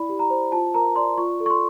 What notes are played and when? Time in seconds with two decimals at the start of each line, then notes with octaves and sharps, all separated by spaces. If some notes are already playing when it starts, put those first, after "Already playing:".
Already playing: E4 D5 B5
0.09 G4
0.19 A#5
0.30 C5
0.52 F4 A5
0.74 A#4 A#5
0.96 D5 C6
1.18 F4 C#6
1.40 A4
1.46 C#6
1.50 C6